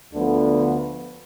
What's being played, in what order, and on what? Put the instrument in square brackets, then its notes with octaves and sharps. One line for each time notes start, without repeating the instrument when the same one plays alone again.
[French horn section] D2 D3 F3 B3